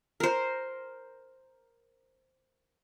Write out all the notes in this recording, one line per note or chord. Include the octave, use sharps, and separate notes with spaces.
A#4 C5